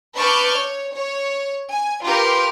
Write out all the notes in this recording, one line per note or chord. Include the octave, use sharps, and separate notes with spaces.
B4 A5 C#6 D6 F6 G6
C#5
C#5
G#5
F4 G4 A#4 B4 C6